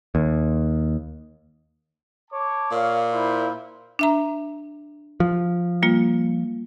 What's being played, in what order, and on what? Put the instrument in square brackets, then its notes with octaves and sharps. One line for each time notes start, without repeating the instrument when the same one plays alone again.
[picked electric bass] D#2
[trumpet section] C#5 A5 D6
[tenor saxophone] A#2 [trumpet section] C#5 F5
[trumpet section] E4 C5 E5
[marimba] D4 E5 A#5
[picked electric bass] F3
[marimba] G3 A#3 F4